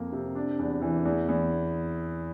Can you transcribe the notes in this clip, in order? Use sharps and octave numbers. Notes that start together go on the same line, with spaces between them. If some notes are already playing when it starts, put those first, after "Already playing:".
Already playing: F2 A#3
C3
D4
E2
E3
E2
E2